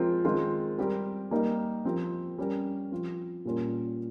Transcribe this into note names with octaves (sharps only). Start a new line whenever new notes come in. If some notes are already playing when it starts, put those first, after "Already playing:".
Already playing: F3 G#3 C4 F4 A#4
D#3 G#3 C4 F4
G3 C4 G4 A#4
G3 A#3 D#4 A#4
F3 C4 G4 A#4
G3 C#4 G4 A#4
F3 C4 F4
A#2 G3 C#4 F4 A#4